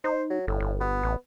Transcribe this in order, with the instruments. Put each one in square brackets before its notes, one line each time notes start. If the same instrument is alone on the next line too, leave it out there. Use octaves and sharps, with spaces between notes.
[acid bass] D#4 [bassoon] C5
[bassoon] F#3
[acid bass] G1 [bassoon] A2
[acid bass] G1
[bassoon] B3
[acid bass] A1